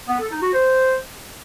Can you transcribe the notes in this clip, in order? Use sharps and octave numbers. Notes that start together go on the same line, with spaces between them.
B3
A4
D#4
F#4
C5